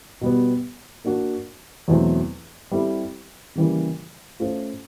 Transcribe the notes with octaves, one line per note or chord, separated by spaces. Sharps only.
B2 G3 B3
A#3 D4 F#4
E2 B2 F#3 A3 C4
G3 C4 E4 A4
C#3 E3 G3 A#3
A3 C#4 F4 A4 C5